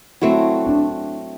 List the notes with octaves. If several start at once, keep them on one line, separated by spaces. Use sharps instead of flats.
F#3 A3 C4 E4
D4